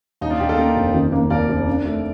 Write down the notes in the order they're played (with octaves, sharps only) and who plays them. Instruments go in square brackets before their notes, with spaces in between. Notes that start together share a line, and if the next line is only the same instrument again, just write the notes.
[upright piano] D#2 [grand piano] D#4
[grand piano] D4 F4
[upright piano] D#2 [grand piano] D#4 G4
[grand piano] F4 A4
[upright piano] A#3 [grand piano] G4 A#4
[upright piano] F1
D#3
A#3
[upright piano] D#2 [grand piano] A#4 D5
[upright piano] F1
D4
A3